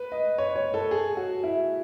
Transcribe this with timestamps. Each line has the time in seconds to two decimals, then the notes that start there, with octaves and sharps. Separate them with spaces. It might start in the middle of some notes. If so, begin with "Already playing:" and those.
Already playing: B4
0.12 D#5
0.38 C#5
0.56 C#5
0.74 A4
0.91 G#4
1.17 F#4
1.44 E4